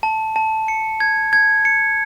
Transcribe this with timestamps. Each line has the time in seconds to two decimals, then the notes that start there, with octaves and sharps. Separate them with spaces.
0.03 A5
0.36 A5
0.68 C#7
1.00 G#6
1.33 G#6
1.65 C#7